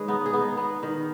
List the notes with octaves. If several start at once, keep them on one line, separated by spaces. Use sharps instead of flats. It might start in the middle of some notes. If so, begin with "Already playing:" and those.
Already playing: D#3 G#3 G#4 B4 C#5
B3 D#4
G#4
B3
D#4
B3
D#3